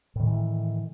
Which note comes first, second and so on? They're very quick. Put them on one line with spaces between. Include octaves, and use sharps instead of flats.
A2 D#3 F#3 E3